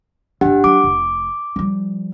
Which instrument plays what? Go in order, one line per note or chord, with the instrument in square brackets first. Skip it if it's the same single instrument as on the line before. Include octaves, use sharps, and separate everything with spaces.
[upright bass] G1 F2 [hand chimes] D4 G4 F#5
[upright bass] F#3 [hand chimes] D6
[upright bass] F1
F3 G3